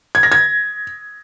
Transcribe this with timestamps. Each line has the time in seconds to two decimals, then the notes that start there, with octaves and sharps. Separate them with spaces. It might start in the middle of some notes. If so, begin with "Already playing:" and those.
0.15 G#6
0.23 A#6
0.32 G#6